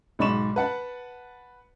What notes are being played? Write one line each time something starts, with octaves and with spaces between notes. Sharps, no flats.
B1 G#2 D5 B5 C#6 E7
B4 F#5 A5